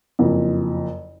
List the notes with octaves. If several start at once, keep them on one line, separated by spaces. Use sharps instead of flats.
F#1 F2